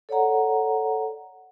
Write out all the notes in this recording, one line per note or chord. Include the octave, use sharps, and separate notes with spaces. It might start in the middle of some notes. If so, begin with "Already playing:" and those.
A4 C#5 D5 F#5 A#5